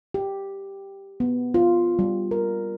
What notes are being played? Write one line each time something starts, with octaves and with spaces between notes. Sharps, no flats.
G4
B3
F4
G3
A#4